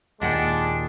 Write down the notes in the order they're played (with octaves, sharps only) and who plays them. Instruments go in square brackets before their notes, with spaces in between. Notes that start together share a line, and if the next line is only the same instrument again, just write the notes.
[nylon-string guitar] D#2 A#2 [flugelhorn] G#3 [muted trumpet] D4 [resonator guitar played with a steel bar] D#5 F#5 G5